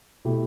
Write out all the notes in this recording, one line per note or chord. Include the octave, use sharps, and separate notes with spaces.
B2 A3 E4 G4